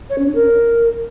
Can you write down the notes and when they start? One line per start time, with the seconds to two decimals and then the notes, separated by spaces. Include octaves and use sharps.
0.10 C#5
0.18 C#4
0.27 D4
0.35 A#4